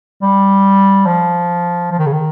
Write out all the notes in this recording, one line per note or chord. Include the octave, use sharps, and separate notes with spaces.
G3
F3
F3
D#3
C#3
D#3